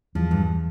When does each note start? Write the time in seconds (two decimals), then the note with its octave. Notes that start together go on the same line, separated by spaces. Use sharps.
0.15 E2 F3
0.31 G2